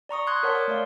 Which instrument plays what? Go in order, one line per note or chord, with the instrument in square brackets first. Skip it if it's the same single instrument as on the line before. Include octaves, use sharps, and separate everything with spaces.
[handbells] D5 A#5 C#6 D#6
C6 D#6 F#6 G#6
A#4 C#5 F#5 A5 C6 G6
D6
A3 D5 F5